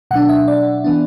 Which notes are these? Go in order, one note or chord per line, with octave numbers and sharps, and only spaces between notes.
B2 F#3 D4 F#5
E5
D5
E3 B3 D4